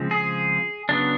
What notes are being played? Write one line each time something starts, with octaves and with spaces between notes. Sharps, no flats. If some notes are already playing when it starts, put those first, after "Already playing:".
Already playing: C#3 F3 G#3 C4
G#4
C#3 F#3 B3 D4